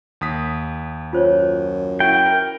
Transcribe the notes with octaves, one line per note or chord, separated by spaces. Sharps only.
D#2 D#6 B6
F#2 F4 C5 C#5
E4 F#4 G5
A#4